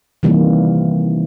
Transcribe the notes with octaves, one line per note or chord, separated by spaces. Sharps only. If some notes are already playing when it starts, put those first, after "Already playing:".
C3 D#3 E3 G3 A#3